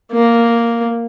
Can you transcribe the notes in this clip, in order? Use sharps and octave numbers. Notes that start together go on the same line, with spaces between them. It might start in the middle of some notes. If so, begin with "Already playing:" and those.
A#3